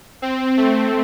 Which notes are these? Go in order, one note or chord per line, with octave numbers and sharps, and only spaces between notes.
C4
A3